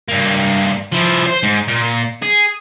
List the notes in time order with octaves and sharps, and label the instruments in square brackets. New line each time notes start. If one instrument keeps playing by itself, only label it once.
[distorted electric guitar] G2 A#3
F3 E4
C5
G#2
A#2
G#4